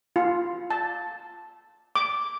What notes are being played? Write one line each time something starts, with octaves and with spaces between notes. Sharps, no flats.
F4
A5
D6